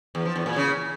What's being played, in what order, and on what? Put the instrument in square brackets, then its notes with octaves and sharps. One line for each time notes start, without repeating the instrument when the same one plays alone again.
[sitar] E2
F3
E2
A#2
C#3